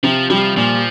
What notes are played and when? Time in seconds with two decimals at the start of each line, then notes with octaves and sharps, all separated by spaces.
0.03 C3 F3
0.30 F3 G3
0.56 A#2 F3